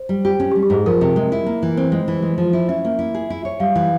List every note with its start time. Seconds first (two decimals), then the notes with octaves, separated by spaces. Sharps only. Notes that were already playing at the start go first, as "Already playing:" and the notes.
Already playing: C5
0.09 G3
0.25 G4
0.40 C#4
0.52 G4
0.56 G3
0.63 G4
0.70 G#2 G#4
0.86 F3 A#4
1.01 C3
1.16 G#3
1.32 E4
1.46 A#3
1.63 E3
1.77 C4 C5
1.92 G#3
2.08 E3
2.22 G#3
2.38 F3
2.53 E4
2.69 C#4 E5
2.85 A#3
2.99 E4
3.15 G#4
3.30 E4
3.45 C#5
3.60 G3 F5
3.75 E3